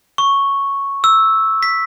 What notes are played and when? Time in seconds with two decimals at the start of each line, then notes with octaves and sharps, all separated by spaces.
0.18 C#6
1.04 E6
1.63 B6